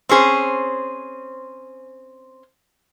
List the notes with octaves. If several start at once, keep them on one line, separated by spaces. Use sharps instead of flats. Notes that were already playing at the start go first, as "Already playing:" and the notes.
C4 C#4 G#4 C5